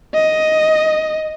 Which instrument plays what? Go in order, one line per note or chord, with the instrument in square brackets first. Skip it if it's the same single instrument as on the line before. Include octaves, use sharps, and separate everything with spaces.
[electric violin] D#5